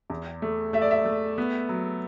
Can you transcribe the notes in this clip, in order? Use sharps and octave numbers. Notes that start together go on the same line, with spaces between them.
E2
A3
A3 E5
D5
E5
A3
B3
F#3